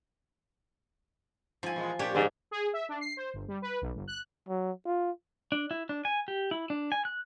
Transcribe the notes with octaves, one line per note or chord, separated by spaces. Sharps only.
G2 F3 G#5
A#2 E3 G#3
A#2 D4 G4 C#5
E2 G#2 D3 D5
G#4
E5
D4
C7
C5
G1
G3
B4
B1
G1
F#6
F#3
F4
D4
E4
D4
G#5
G4
E4
D4
G#5
F#6